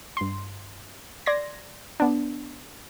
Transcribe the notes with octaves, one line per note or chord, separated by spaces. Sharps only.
G2 C6
D5 C6 G#6 A#6
B3 D4